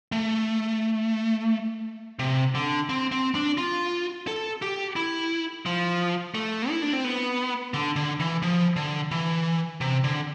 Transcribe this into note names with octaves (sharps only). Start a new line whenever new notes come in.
A3
C3
D3
C4
C4
D4
F4
A4
G4
E4
F3
A3
E4
D4
C4
B3
D3
D3
E3
F3
D3
E3
C3
D3